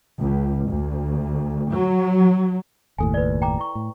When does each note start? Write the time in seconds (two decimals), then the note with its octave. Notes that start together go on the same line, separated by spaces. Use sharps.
0.18 C#2
0.68 D2
1.70 F#3
2.98 F#1 D#2 A2 A4 G#5
3.14 B4 D5
3.42 G5 A#5 D6
3.58 E4 C#6
3.75 A2